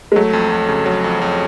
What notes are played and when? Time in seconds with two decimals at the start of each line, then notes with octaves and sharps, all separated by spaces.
0.12 G#3
0.16 F#3 A3
0.33 F2
0.52 F2
0.68 C#3
0.86 F#3
1.04 F2
1.21 F2